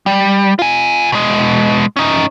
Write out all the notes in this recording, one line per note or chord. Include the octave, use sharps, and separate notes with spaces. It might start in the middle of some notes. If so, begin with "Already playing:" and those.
G3
F4 G#5
B2 G#3
C#4 D#4